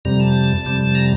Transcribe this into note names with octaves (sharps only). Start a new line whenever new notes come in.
F2 C3 G3 A#5
A5
F2 C3 G3
A#5